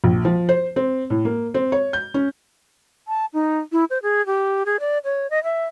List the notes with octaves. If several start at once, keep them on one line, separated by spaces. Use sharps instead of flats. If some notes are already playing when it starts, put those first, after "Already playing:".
A#1
F3
C5
C4
A2
A#3
C4
C#5
G6
C#4
A5
D#4
E4
C5
G#4
G4
G#4
D5
C#5
D#5
E5